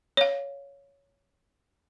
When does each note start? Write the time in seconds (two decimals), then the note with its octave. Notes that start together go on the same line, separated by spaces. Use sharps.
0.17 C#5 F5